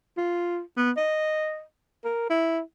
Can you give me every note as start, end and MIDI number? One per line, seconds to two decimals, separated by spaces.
0.17 0.60 65
0.77 0.91 59
0.97 1.62 75
2.05 2.28 70
2.30 2.60 64